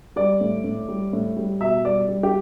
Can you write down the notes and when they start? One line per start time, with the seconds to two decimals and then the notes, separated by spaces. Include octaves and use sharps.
0.16 G3 D5
0.41 A2
0.64 A2
0.89 G3
1.13 A2
1.37 G3
1.61 B2 E5
1.84 G3 D5
2.09 G3
2.23 G4